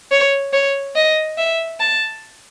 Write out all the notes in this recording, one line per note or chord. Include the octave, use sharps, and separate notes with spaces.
C#5
C#5
D#5
E5
A5